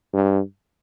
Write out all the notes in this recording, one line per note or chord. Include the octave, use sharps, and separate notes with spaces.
G2